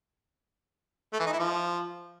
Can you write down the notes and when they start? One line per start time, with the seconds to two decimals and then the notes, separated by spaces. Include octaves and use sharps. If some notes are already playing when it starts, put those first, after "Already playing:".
1.13 A3
1.20 E3
1.26 D#4
1.33 E4
1.39 F3